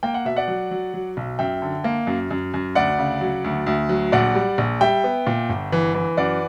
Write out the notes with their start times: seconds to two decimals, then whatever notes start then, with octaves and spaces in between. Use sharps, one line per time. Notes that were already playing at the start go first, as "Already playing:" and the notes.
0.03 A#3 G5
0.14 F#5
0.25 B2 E5
0.36 D5 F#5
0.48 F#3
0.71 F#3
0.94 F#3
1.17 B1
1.39 F#2 E5 G5
1.62 D3
1.84 A#3
2.07 F#2
2.31 F#2
2.54 F#2
2.75 D2 D5 F#5
2.99 C#3
3.21 F#3
3.44 D2
3.66 D2
3.89 F#3
4.12 A#1 D5 F#5
4.35 G3
4.58 A#1
4.81 G3 E5 G5
5.04 B3
5.27 A#2
5.49 G1
5.72 E3
5.94 E3
6.17 F#2 D5 F#5